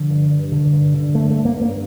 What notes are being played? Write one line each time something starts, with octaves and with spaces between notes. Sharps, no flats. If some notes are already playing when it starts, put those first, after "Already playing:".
Already playing: D3 F3
G2
G2
D3
G2
D3
G2 A3
A3
G2
A#3
G2 A#3